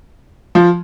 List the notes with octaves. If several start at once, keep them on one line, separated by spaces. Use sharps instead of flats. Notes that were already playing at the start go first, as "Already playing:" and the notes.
F3